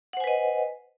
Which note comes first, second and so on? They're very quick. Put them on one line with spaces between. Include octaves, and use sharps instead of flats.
F#5 C5 G#5 B4 D#5